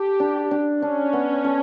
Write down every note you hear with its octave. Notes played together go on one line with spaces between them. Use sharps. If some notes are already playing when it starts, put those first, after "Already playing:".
Already playing: G4 A4
D4
D4
C#4 D4
B3
A4